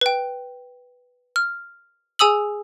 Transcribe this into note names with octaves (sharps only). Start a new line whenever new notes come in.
B4 G5
F6
G#4 G#5 D#6 E6 F#7